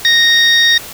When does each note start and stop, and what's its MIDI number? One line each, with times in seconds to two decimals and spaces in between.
0.05 0.77 94